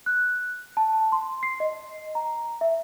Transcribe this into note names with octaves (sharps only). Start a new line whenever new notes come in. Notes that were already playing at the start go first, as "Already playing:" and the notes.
F#6
A5
C6
C7
D#5
A#5
E5